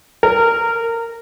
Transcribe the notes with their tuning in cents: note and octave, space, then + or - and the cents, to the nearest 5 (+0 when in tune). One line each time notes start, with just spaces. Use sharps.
A#4 -20